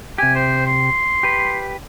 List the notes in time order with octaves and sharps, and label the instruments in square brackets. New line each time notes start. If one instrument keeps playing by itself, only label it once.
[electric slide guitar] C3 G4 [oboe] G#5
[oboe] C5
C6
[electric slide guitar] G4 B4